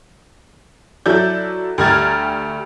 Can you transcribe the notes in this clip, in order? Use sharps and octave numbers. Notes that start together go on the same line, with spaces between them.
F#3 E4 A4 D5 G6
D2 G3 A#5 F6 G#6 A6